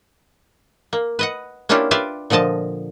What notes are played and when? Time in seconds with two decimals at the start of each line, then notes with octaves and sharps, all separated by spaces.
0.93 A#3
1.19 B4 D#5 F#5
1.69 A#3 C#4 D4 E4 F4 G4
1.91 F4 G4 B4 D5 E5
2.30 A#2 D3 F3 D#5 A5